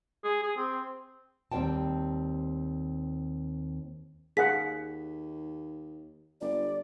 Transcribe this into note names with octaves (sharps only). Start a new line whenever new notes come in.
G#4
G#4
C4
D#2 G3 C4 C5 G5 A5
D#2 G#4 F5 F#5 B6
G1 D5